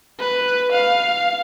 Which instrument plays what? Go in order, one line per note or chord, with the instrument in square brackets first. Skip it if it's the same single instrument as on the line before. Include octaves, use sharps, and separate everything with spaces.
[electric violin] B4
F5